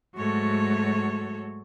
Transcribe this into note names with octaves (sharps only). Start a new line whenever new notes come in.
G#2 F#3 A3 F#4 A4 C#5